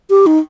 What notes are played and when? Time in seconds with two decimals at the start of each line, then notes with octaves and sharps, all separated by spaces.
0.10 G4
0.26 D#4